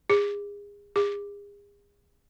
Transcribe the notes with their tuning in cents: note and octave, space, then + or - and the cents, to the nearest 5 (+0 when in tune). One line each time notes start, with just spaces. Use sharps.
G#4 -30
G#4 -40